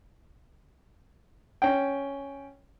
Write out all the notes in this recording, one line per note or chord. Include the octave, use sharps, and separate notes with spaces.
C#4 G5